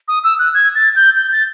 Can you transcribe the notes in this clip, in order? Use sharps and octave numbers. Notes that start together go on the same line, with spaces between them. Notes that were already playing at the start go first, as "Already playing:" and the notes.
D#6
E6
F#6
G#6
A6
G6
G6
A6